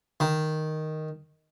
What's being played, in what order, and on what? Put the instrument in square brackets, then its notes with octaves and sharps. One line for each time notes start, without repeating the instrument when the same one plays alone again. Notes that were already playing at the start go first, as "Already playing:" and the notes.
[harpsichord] D#3